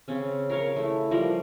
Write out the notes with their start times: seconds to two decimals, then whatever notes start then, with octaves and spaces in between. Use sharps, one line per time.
0.08 C#3 C4 C#4
0.50 A#4 C#5 F5
0.76 A3 E4
1.11 F3 G3 A#4